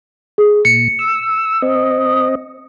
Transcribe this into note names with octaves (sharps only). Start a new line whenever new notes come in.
G#4
A#2 C#7
E6
C4 D#5